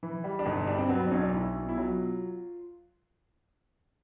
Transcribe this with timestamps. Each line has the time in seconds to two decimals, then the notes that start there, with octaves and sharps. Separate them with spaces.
0.03 E3
0.24 G3
0.39 D4
0.46 G1 D#4
0.57 D#4
0.67 G2 D4
0.78 C4
0.89 F#3 B3
1.00 C4
1.07 D4
1.11 B1 C#4
1.23 D4
1.33 B1 E4
1.56 B2
1.69 E4
1.77 F#3 F4